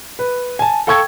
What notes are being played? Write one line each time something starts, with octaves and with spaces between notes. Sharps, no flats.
B4
G#5 A5
A4 F5 G5 C#6 E6 G#6